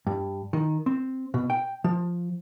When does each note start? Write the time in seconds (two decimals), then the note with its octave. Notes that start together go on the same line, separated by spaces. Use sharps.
0.07 G2
0.53 D#3
0.86 C4
1.34 B2
1.50 G5
1.84 F3